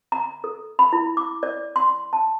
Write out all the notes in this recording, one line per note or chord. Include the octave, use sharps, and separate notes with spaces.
A#5
A4
B5
E4
D6
D5
C6
A5